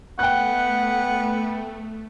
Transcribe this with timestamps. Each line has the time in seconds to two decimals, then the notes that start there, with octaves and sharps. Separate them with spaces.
0.19 A3 B3 F#5 G5 F#6